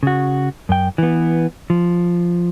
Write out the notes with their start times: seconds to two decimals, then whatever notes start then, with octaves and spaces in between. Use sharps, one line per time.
0.03 C#3 F#4
0.69 F#2 G5
0.98 E3 B3
1.70 F3